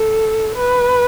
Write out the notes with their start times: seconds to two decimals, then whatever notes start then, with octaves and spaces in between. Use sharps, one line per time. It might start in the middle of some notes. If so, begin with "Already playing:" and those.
Already playing: A4
0.56 B4